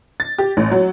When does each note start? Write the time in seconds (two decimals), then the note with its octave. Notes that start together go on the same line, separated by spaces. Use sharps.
0.20 A6
0.38 G4
0.57 A1
0.71 F#3